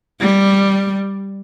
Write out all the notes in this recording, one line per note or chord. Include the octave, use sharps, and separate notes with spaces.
G3